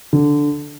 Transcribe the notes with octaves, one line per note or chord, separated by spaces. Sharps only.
D3